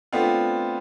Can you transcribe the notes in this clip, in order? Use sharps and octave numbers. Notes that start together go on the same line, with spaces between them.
A3 B3 C4 D4 F4